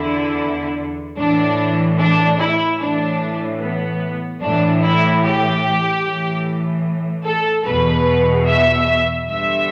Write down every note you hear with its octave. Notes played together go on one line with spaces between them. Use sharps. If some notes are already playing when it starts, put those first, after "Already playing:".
Already playing: E2 D3 E4
A2 E3 D4
D4
E4
A2 E3 D4
B3
A2 E3 D4
E4
G4
A2 E3
A4
E2 B2 B4
E5
G2 D3 E5